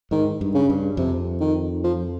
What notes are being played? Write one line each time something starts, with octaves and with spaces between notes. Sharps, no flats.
G#2 D#3
G2
C#3
G2
F2 C3
D#3
F3